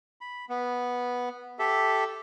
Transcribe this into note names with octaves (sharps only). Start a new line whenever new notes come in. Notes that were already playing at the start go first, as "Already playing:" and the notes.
B5
B3
G4 A4 E5